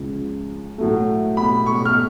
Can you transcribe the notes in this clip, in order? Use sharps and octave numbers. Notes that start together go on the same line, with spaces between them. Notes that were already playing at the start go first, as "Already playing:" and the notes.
Already playing: C#2 C#3 F3 G#3
A2 F#3 A3
B5
C#6
F6